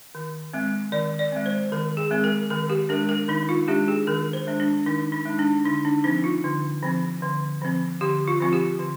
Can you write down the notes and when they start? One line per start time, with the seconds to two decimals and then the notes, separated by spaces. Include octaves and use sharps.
0.15 D#3
0.53 G#3 C4
0.92 D#3 D5
1.19 D5
1.32 G#3 C4
1.46 C5
1.72 D#3 A#4
1.97 G#4
2.11 G#3 C4
2.24 A#4
2.50 D#3 A#4
2.70 G4
2.89 G#3 D4 A#4
3.09 A#4
3.28 D#3 D#4
3.49 F4
3.68 G#3 D4 G4
3.88 G#4
4.07 D#3 A#4
4.33 C5
4.47 G#3 D4
4.60 D4
4.86 D#3 D#4
5.12 D#4
5.26 G#3 D4
5.39 D4
5.64 D3 D#4
5.85 D4
6.04 F3 C4 D#4
6.24 F4
6.44 D3
6.83 F3 C4
7.22 D3
7.62 F3 C4
8.01 D3 G4
8.28 F4
8.40 F3 C4 F4
8.53 G4
8.80 D3